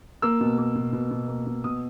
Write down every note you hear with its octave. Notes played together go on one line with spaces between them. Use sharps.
A#3 E6
B2
A#3
B2
B2
B2
A#3
B2
B2 D#6